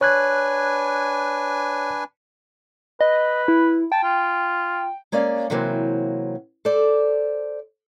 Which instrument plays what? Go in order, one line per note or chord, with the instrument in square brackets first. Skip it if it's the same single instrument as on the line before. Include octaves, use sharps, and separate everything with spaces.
[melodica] D4 B4 G#5 [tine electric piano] C#5 F#6 G#6
[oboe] B4 [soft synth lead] D#5
[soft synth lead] E4
[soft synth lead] G5 [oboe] A5
[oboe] F4
[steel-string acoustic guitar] G#3 A#3 C#4 D5 F5
C3 E3 F#3 A#3 C4
A4 C5 D5